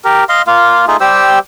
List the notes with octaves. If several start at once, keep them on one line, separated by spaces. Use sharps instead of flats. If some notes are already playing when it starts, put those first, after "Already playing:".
G4 A#4
D#5 F5 C6
A#3 F4 F5
A3 D#4 F4 G#4
G3 G4 C5 E6